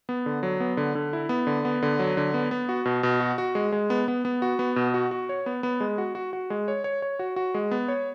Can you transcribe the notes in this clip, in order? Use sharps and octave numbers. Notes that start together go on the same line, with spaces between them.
B3
D3
F#3
B3
D3
D3
E4
B3
D3
B3
D3
F#3
D3
B3
B3
F#4
B2
B2
F#4
F#4
G#3
G#3
B3
B3
B3
F#4
B3
B2
F#4
F#4
C#5
B3
B3
G#3
F#4
F#4
F#4
G#3
C#5
C#5
C#5
F#4
F#4
G#3
B3
C#5